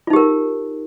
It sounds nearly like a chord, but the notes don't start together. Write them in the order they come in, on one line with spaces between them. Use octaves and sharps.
F4 D#4 G4 A#4